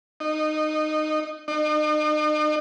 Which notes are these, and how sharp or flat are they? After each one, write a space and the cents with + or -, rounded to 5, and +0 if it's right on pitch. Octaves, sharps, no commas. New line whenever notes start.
D#4 -15
D#4 -40